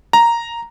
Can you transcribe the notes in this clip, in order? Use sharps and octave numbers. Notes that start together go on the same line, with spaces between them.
A#5